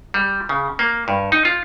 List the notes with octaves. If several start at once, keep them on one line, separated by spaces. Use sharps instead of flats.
G3
C#3
A#3
G2
D#4
F4